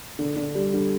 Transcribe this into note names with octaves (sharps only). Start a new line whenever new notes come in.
D3
D3
G3
D3